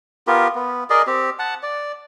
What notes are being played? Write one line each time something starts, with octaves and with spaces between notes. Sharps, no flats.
B3 F4 G4 A#4
B3
G#4 A#4 D5 D#5
C4 G4
F#5 A5
D5